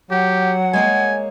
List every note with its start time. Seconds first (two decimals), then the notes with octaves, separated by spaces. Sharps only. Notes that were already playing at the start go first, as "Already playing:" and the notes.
0.11 F#3 G4 F#5
0.73 G#3 A#3 C#5 G#5